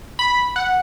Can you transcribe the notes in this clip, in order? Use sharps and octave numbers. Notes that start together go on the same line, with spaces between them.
B5
F#5